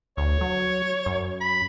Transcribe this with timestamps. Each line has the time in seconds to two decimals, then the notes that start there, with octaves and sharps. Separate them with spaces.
0.17 D2 C#5
0.41 F#3
1.06 F#2
1.41 B5